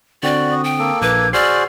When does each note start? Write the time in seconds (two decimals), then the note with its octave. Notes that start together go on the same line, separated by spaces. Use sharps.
0.23 D3 C4 F#4 D5 G5
0.51 D#6
0.64 G5
0.79 A#3 A4
1.02 A#1 B4 D6 G#6
1.33 F#4 G#4 C5 D5 E6 F6 C7